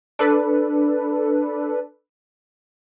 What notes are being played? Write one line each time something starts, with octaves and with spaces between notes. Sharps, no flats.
D4 A4 B4